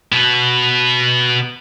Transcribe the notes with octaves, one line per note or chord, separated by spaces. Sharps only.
B2 B3